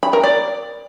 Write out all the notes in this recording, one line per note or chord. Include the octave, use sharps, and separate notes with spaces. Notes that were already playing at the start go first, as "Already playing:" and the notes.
B5
A#4
D5